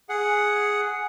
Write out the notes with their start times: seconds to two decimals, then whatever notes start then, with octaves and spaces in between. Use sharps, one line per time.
0.09 G#4 F#5